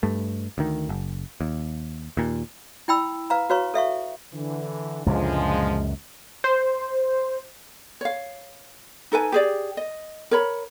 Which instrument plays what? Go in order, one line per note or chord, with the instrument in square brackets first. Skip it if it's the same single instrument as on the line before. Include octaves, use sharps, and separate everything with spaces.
[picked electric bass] G2 A3
D2 D#3
F#1
D#2
D#2 A#2
[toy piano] E4 G5 B5 E6
B4 F5 A#5
F#4 B4 C#5 F5 A#5 C#6
A4 E5 F5 C#6
[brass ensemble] D3 E3
[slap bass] C#2 F#2 A#2 [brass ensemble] D3 F3 G#3
[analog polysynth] C5
[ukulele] C#5 F5
D#4 A4 B4 G#5
G4 G#4 D5
D#5
A#4 C#5 B5